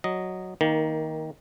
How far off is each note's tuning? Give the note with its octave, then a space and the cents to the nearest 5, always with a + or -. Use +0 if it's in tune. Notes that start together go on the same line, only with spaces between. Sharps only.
F#3 +0 D#5 +0
D#3 +15 A#3 +0